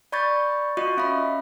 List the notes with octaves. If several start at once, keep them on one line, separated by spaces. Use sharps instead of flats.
D5 B5 C#6 G6 A6
F4 F#4 D#5 C#6
C#4 E5 F5 B5